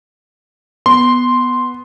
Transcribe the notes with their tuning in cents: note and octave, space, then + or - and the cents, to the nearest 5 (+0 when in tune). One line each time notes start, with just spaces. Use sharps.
B3 +0 C6 +0